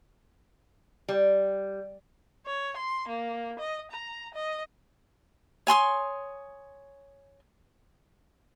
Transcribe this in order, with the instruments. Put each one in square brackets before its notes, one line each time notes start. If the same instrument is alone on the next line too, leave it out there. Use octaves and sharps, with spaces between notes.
[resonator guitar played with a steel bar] G3
[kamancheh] C#5
C6
A#3
D#5
A#5
D#5
[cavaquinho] C#5 G#5 C6 D#6